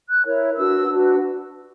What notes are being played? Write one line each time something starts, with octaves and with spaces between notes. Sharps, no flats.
F#6
E4 A#4 C#5
D4 F#4 B4 E6
D4 F#4 B4